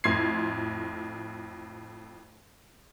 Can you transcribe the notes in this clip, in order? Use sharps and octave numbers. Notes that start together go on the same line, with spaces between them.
F2 A2 C6 G#6 C7